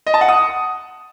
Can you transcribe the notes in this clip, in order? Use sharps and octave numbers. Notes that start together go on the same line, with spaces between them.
D#5
A5
F#5
D#6